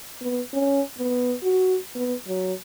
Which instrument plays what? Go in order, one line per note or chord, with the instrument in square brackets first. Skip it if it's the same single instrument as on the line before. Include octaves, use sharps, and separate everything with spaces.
[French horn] B3
C#4
B3
F#4
B3
F#3